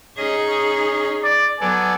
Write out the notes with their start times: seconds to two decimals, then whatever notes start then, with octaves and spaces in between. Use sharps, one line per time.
0.18 C#4 D#4 G#4 D#5
0.47 C#4
1.24 D5
1.61 F#3 B3 A4 D5 G#5